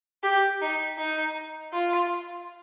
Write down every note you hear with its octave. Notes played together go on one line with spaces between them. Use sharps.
G4
D#4
D#4
F4